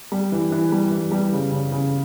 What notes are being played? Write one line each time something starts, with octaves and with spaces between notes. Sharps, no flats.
G3
E3
E3
G3
E3
G3
C#3
C#3
C#3